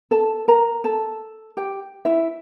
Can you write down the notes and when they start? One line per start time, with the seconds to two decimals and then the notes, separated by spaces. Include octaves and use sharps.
0.11 A4 A5
0.48 A#4 A#5
0.84 A4 A5
1.57 G4 G5
2.05 E4 E5